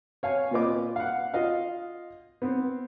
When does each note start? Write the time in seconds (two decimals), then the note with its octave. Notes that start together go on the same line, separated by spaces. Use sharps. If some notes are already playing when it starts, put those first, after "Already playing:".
0.23 C#5 F5 G#5
0.51 A#2 C4 F4 B4 D#5 D6
0.96 F5 F#5
1.34 F4 D#5 F5
2.42 B3 C4